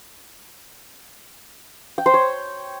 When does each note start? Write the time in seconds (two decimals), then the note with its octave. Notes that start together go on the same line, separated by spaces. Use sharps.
1.98 G5
2.06 C5
2.14 C#5